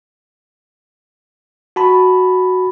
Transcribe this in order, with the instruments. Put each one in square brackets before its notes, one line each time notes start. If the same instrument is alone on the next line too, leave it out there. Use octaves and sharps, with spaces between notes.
[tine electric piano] F#4 A5 B5